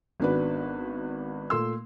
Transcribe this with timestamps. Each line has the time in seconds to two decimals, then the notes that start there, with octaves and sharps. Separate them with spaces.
0.20 G#1 B3 D4 F#4 B4
1.50 A#2 A3 C6 E6